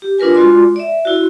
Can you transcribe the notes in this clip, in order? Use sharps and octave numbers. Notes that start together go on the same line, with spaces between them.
G4
D4 F4 A#4 B4 G#5
G#3 F4 F#4 D5 C6 D6
D5 E5
E4 F#4